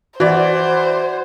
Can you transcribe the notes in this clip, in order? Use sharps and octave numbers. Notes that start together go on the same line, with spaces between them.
E3 F#4 C5 D5